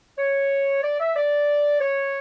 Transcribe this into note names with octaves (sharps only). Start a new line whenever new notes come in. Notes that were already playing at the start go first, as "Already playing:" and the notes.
C#5
D5
E5
D5
C#5